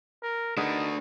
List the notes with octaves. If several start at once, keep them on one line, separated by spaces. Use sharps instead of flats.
A#4
A3 B3 D4 D#4 G#4 A#4